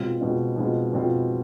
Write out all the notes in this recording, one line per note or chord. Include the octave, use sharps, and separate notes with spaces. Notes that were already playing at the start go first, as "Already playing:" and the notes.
Already playing: B2 G#3 C4 F4
B2 G#3 C4 F4
B2 G#3 C4 F4
B2 G#3 C4 F4